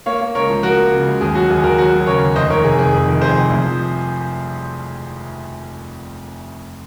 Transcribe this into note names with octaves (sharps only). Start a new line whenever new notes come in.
A#3 C#5 F5
A#3
C#2 A#4 C#5
F3
F3 F#4 A#4
A#3
C#3
C#2
D#2 G#4
F#3 F#4
D#2 G#4
D#2 F#4 A#4
F#3 F#4
F#3
C#3 A#4 C#5
D#2
F1 C5 D#5
D#3 A#4 C#5
C3 G#4
F1 G#4
F2 G#4
D#3
F2 G#4 C5
C3
C2
F3